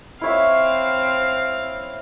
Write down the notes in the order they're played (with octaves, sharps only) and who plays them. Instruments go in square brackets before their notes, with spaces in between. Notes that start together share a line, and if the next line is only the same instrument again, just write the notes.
[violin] C4 F5 [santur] E4 C#5 E5